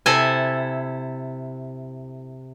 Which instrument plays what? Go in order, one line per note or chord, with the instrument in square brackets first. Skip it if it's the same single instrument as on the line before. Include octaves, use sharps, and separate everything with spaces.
[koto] C3 E4 A4 G#5